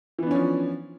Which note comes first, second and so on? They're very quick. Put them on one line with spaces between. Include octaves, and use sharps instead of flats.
E3 B3 D4 C#4 F3